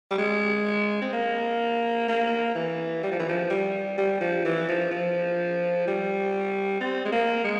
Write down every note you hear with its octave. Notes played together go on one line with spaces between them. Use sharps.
G3
G#3
C4
A#3
A#3
E3
G3
F3
E3
F3
G3
G3
F3
E3
F3
F3
G3
C4
G#3
A#3
G#3